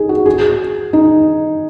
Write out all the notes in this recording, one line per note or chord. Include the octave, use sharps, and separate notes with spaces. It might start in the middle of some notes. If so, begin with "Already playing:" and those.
Already playing: D#4 G#4
F#4
G#4
D#4